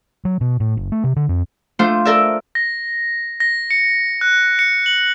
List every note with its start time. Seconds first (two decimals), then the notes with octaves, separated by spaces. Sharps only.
0.25 F#3
0.41 B2
0.60 A2
0.77 F#1
0.92 A3
1.04 C3
1.16 D3
1.29 F2
1.79 A3 D4 F4 C5 F5
2.05 A4 A#4 D5 E5
2.55 A#6
3.40 A#6
3.71 C#7
4.21 F#6
4.59 C#7
4.86 F#7